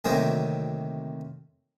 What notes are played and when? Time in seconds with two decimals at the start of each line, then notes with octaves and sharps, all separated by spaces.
0.05 D2 C3 D#3 F#3 A#3 C4